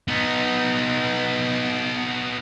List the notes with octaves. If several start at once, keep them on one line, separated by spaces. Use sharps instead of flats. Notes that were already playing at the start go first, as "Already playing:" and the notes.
B3 D#4